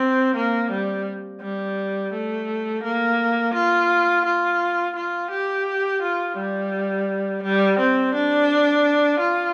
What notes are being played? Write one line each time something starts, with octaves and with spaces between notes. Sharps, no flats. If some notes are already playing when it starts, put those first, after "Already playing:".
Already playing: C4
A#3
G3
G3
A3
A#3
F4
F4
F4
G4
F4
G3
G3
C4
D4
F4